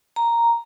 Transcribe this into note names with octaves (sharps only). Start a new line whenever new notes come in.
A#5